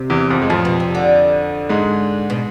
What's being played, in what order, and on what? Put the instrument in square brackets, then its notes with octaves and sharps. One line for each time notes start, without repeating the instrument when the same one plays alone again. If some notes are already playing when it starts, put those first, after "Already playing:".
Already playing: [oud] C3
[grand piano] E2 E3
F2 F3
G#3
[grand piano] F2 F3 [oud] A2
[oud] B2
C3
D3
[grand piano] G#2 G#3
[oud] B2